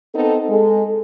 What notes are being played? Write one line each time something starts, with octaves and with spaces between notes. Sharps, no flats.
B3 C4 D#4 A4
G#3 A4